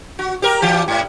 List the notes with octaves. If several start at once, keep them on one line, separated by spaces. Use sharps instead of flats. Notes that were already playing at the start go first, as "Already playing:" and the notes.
F#4
G4 A#4
E3 G4
G#2